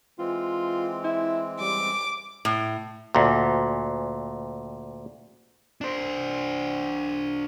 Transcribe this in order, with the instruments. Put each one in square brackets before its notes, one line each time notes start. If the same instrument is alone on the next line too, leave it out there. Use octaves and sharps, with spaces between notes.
[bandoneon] E3 G#3 C4 [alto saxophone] F4
[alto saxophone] E4
[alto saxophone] G3 [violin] D6
[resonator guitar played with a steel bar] A2
[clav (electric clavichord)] D2 A#2
[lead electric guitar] D4 C5